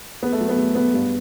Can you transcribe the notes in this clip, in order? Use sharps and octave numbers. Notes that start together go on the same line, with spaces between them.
E2 B3
A3
F#3
B3
E2 A3
B2 B3
G2